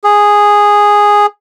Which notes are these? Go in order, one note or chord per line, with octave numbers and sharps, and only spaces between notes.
G#4